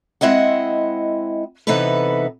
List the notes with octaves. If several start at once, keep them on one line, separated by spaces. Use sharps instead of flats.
G#3 C4 E4 D#5 F#5
C3 E3 B3 D#4 A4 B4